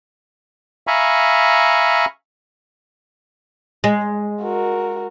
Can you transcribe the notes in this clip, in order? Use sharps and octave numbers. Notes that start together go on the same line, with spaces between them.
E5 F5 G#5 A#5 B5 C#6
G#3
F#4 A#4